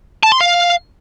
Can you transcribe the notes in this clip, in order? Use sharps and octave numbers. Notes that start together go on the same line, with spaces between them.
A5
C6
F5